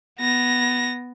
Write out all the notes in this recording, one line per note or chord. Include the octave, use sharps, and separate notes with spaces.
B3 A#6